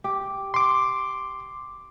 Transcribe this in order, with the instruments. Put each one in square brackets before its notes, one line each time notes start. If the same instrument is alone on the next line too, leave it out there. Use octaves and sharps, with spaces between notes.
[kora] G4
[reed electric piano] C6 D6